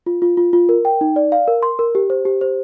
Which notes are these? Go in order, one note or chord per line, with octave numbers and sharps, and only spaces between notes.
F4
F4
F4
F4
A#4
G5
D#4
D5
F5
A#4
C6
A#4
G4
C5
G4
C5